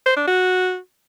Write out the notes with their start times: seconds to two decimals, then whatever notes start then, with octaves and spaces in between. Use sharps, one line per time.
0.06 C5
0.16 D4
0.27 F#4